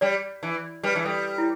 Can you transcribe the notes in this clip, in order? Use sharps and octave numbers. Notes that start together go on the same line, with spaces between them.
G3 D5
E3
G3 B4
E3
G3 A4
E4